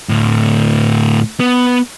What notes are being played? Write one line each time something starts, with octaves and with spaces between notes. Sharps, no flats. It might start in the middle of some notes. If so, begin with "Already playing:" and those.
D2 A2
B3